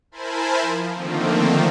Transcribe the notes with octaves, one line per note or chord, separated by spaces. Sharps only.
E4 A#4 C5 G#5 A5 B5
F3
D3 D#3 F3 A3 A#3 C4